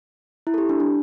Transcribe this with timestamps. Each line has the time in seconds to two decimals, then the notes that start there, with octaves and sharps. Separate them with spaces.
0.47 E4
0.54 A4
0.58 G4
0.69 D4
0.80 D4